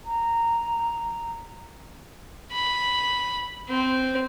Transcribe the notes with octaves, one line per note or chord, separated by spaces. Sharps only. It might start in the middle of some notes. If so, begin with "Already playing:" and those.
A#5
B5
C4